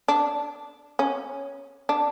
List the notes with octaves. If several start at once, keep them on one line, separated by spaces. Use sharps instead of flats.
D4
C#4
D4